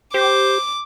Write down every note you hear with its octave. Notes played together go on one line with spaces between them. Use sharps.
G4 C5 D6